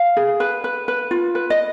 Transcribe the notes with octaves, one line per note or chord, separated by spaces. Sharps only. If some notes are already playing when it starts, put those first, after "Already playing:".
Already playing: F5
G#4
B4
B4
B4
F4
B4
D#5